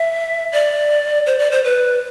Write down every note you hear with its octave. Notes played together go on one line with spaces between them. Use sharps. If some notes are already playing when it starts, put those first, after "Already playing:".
Already playing: E5
D5
C5
D5
C5
B4